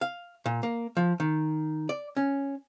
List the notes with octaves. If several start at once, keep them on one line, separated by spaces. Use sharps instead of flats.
F5
A#2
A#3
F3
D#3
D5
C#4